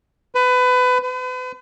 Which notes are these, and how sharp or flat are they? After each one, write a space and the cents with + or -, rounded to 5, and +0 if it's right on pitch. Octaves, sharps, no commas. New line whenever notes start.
B4 +25
B4 +40